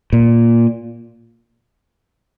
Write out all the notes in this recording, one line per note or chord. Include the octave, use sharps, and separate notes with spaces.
A#2